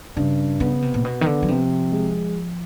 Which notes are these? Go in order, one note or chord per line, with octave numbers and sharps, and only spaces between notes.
G2 C#3
C#3 B3
C3
A#2
B2 B3
D#3
D3
F#3
C3 F3
G#3